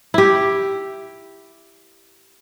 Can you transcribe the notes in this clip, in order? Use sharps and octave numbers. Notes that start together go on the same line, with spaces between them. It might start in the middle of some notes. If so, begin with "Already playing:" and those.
E4 G4